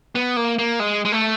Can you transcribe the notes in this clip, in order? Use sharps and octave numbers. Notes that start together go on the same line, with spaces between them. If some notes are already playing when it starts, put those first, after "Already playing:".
B3
A#3
A#3
G#3
G#3
A3